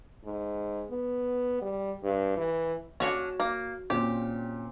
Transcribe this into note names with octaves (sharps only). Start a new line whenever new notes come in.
G#2
B3
G3
G2
E3
C#4 D4 F#4 C#5
A#3
A#2 C4 C#4 G4